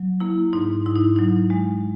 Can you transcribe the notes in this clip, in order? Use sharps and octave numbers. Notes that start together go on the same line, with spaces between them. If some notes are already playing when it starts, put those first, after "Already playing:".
Already playing: F#3
A#3 E4
G#2 D#4
G#2 E4
D#4
F#3 D#4
G#3